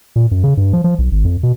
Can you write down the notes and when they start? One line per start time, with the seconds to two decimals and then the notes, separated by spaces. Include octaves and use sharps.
0.16 A#2
0.31 F#2
0.43 C#3
0.57 G2
0.73 F3
0.84 F3
0.99 B1
1.12 G#1
1.25 F2
1.43 B2